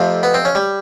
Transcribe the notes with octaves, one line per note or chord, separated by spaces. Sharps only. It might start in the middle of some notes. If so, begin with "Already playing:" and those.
Already playing: F2 C3 F3 A3
B3
C4
C#4
G3